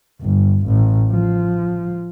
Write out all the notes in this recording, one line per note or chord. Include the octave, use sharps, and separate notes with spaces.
G1
A1
F3